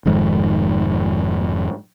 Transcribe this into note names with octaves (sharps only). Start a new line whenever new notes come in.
F1 F2 G#2 D#3